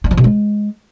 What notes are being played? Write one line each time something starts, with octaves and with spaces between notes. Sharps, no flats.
D4
F3
B2
G#3